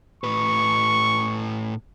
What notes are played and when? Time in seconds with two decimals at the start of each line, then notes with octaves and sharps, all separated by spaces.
0.24 A2 B4 C#6